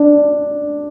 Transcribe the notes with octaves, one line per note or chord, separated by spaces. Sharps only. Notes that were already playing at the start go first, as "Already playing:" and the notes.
Already playing: D4